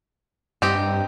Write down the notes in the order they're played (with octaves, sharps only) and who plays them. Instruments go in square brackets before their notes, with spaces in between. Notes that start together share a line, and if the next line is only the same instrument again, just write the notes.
[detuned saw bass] G2 [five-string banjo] C4 D#4 G4